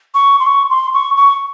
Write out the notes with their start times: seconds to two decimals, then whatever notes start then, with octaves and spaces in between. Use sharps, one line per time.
0.14 C#6
0.39 C6
0.46 C#6
0.70 C6
0.93 C#6
1.16 C#6